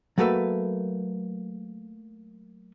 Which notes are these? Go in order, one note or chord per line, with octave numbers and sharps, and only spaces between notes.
F#3 A3 A#3 A4 B4 E5